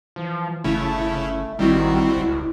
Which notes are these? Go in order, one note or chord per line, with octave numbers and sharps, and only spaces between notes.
E3 F3
G1 C#3 A3 C#4 E4
A1 D#3 G3 C4 E4 F#4
D1 C#2